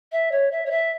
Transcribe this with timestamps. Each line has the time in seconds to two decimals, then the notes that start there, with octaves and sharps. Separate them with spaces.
0.12 E5
0.31 C#5
0.51 E5
0.66 C#5
0.71 E5